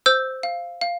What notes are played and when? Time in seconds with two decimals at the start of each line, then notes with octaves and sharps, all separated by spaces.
0.06 C5 E6 G6
0.43 F5
0.81 F5